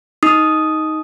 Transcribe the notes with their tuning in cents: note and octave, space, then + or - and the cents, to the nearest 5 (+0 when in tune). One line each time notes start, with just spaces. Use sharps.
D#4 +10 D#6 +0